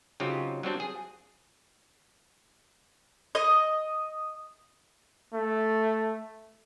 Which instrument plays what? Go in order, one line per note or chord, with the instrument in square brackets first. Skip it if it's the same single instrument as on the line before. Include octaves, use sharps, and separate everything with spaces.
[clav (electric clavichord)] C#3 F#3 C4 D#4 F4 G4
F#3 G3 C4 D4
G#4
[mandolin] D#5
[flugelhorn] A3